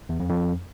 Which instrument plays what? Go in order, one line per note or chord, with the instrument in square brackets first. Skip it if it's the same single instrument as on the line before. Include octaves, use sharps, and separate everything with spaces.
[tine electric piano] E2
F2
F2